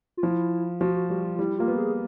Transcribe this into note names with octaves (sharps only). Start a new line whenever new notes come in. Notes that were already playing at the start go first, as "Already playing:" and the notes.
F4
F3 E4
F3 F#4
F#4
G3 F#4
F4
F4
G3 E4
A#3 F4
B3
G#4